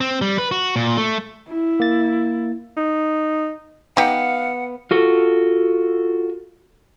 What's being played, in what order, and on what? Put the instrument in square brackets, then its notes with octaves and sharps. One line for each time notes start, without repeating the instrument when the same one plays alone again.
[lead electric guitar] C4
G3
B4
F#4
A#2
A3
[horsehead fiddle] E4
[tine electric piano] A#3 A6
[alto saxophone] D#4
[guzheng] B3 [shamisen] D#4 G4 [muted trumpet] F5 [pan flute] F#5
[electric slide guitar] F4 F#4 A4